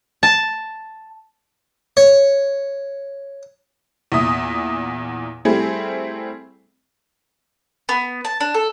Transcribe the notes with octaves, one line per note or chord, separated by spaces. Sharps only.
A5
C#5
E2 A#2 E5 D#6
G3 A3 C4 E4 G#4
B3
A5
D4
A4